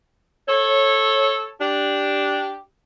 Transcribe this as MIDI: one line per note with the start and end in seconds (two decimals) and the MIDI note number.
0.48 1.49 69
0.48 1.49 73
1.60 2.56 62
1.60 2.56 67